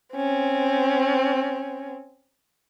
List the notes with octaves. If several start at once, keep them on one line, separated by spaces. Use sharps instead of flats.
C4 C#4